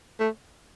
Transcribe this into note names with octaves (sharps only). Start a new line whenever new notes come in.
A3